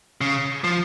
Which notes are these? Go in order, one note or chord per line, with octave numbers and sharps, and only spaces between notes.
C#3
F3